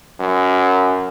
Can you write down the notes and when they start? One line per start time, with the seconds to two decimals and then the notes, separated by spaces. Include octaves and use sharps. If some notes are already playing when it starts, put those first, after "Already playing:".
0.20 F#2